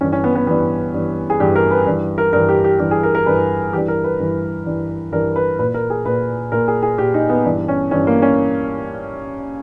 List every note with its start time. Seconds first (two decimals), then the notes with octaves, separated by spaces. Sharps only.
0.01 G2 E3 C#4
0.12 C#4
0.24 B3
0.35 B3
0.47 G2 E3 B3
0.94 G2 E3
1.30 G#4
1.40 G2 E3 G4
1.56 A#4
1.71 B4
1.87 G2 E3
2.18 A#4
2.33 G2 E3 A#4
2.49 G4
2.64 G4
2.79 G2 E3 G4
2.91 G#4
3.03 A#4
3.15 A#4
3.26 G2 E3 B4
3.73 E3 G4
3.77 G2
3.88 A#4
4.04 B4
4.20 G2 E3
4.66 G2 E3
5.12 G2 E3 A#4
5.36 B4
5.59 A#2 B4
5.74 A#4
5.90 G#4
6.05 A#2 B4
6.52 A#2 A#4
6.68 G#4
6.82 G#4
6.98 A#2 G4
7.14 D#4
7.30 B3
7.45 G2 E3
7.68 C#4
7.91 G2 E3 C#4
8.07 A#3
8.22 C#4